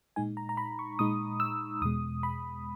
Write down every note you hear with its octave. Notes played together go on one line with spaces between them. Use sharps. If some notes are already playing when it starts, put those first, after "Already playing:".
A#2 G#3 D#4 G#5
A#5
A#5
B5
C#6
A#2 G#3 D#4 D#6
E6
E2 B2 G#3 D#6
B5